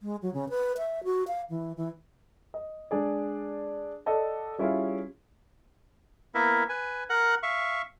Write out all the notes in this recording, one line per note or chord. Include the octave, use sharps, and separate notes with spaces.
G#3
F#3
C#3
B4
E5
F#4
F5
E3
E3
D#5
G#3 D4 G#4 D5
A4 D5 D#5 F#5 A5
G3 C#4 E4 F4 G#4 F5
A#3 B3 E4 A#4 E5
B4 G#5
A#4 F#5 F#6
E5 F5 C#6